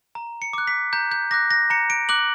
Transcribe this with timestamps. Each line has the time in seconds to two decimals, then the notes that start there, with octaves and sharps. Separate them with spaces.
0.15 A#5
0.42 C#7
0.53 D6 F#6
0.67 B6
0.93 A#5 G6
1.12 G6
1.31 D6 F#6 A#6
1.51 A#6
1.70 A#5 C#7
1.90 D7
2.09 D6 F#6 F#7